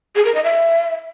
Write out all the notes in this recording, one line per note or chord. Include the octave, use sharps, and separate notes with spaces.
G#4
A#4
D#5
E5